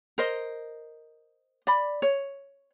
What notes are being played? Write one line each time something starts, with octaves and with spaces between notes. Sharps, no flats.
A#4 C5 D#5
D5 B5
C#5